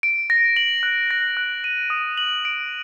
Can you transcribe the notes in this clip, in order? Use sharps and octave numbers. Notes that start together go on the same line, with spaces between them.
D7
A#6
F#7
F#6
A#6
F#6
D#7
D#6
F#7
D7